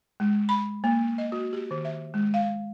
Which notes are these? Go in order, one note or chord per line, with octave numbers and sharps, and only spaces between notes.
G#3
B5
A#3
D#5
F#4
G4
D#3
E5
G#3
F5